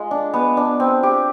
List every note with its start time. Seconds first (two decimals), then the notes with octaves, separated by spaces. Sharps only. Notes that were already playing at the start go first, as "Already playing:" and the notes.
Already playing: G#3 F4 G#4
0.11 D4
0.34 B3
0.57 D4
0.80 C4
1.03 G4